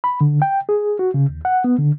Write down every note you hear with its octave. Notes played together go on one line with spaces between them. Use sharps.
B5
D3
G5
G#4
F#4
C#3
D#2
F#5
B3
D3